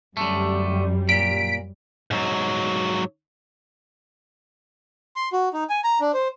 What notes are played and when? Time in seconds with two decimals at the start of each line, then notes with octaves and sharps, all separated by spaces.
0.17 F#2 D3 G3 A3
1.09 A#2 B6 D7
2.11 G#2 F#3
5.16 C6
5.33 F#4
5.54 D#4
5.70 G#5
5.84 A#5
6.01 D4
6.14 C5